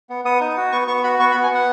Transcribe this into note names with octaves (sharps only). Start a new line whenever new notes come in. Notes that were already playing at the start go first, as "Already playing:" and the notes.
B3
B3 D#6
D#4
F#4
B3 C#6
B3 C#6
F#4 B5
B3 C#6
B5
B3
G#5
B3 F#5